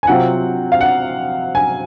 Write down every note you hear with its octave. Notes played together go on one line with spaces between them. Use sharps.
G#5
C3 F#3 C4 F4 F#5
F5
F#5
G#5